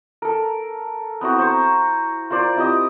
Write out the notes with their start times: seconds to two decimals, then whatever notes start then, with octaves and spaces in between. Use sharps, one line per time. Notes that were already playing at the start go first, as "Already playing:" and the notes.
0.22 A4 A#4
1.21 B3 C4 E4 F#4
1.38 C5 A#5 C#6
2.30 F4 A#4 C5 D5
2.56 C4 E4 G4 D#5